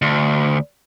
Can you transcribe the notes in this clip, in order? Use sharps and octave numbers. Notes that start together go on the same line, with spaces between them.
D2